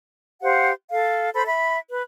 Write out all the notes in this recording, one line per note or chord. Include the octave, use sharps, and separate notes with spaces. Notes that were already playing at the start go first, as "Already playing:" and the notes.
G4 C5 F5 F#5
A4 F5
A4 C5 B5
E5 B5
B4